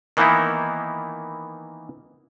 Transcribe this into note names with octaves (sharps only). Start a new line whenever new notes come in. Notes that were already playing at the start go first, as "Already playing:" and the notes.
D#3 E3 A#3 B3 D#4 E4